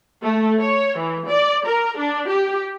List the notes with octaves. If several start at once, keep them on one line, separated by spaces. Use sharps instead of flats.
A3
C#5
E3
D5
A#4
D4
G4